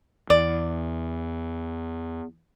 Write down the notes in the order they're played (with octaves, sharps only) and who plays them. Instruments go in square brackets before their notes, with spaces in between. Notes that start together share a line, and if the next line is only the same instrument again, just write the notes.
[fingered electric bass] E2 [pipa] D5